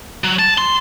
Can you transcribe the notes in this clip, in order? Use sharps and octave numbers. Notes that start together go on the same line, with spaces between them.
F#3
A5
C6